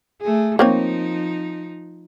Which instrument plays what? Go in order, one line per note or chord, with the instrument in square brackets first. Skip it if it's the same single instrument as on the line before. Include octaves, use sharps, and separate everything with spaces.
[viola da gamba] A3 G#4
[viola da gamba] F3 D#4 [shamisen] A#3 C4 C#5